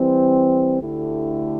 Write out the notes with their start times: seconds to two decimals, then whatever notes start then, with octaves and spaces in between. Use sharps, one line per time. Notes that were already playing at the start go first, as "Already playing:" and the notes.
Already playing: E3 G3 C4
0.81 D2 D3 A3 E4 G4